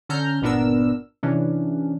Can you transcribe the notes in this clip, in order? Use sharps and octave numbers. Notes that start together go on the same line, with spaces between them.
D3 C#4 A4 A#5 F6 G6
G1 A#2 B3 D4 A#4 E6
C3 E3 C#4 D4